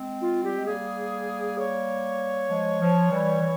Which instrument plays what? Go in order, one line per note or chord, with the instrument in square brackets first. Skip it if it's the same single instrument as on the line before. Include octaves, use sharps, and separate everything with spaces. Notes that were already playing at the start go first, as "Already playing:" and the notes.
Already playing: [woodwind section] G#3 C4
[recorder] F4
[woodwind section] G3 [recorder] G4
[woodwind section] G#3
[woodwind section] G3 A#3 [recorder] G#4
[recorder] C#5
[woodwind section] F3 G#3
F3
E3 G3
E3